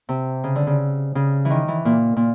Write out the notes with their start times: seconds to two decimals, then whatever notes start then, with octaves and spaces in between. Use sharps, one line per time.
0.09 C3
0.44 C#3
0.56 D3
0.67 C#3
1.15 C#3
1.45 E3
1.50 D#3
1.68 E3
1.85 A#2
2.16 A#2